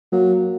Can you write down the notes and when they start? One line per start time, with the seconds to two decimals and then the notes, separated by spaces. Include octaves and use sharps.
0.12 F#3 A#3